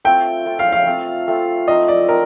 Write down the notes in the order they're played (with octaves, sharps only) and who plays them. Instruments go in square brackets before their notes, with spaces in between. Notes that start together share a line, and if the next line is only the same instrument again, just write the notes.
[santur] A3 C4 F4 A4 [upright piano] G5
[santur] A3 C4 F4 A4
[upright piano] F5
F5
[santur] A3 C4 F4 A4
A3 C4 F4 A4
[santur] F3 A3 C4 D#4 [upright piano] D#5
[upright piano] D5
[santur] A3 C4 D#4 [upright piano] A#4